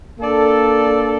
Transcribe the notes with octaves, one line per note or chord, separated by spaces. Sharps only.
A#3 D4 A4 D5